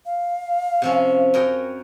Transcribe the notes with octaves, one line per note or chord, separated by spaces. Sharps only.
F5
C3 F3 C#4
F#2 A#4 G5